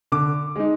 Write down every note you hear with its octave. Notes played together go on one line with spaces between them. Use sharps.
D3 D6
G#3 D#4